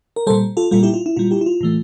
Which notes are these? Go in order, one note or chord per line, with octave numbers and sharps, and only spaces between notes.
A#4
A#2 G3 A4 C5
F4 A4
A#2 G3 F4 A4
E4 G4
F4
E4
A#2 G3 F4
E4 G4
E4
F4
A2 E3 A3